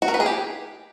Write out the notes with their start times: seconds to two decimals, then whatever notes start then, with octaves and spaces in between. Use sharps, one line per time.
0.02 F#4
0.08 A#4
0.14 B4
0.20 G#4
0.26 G4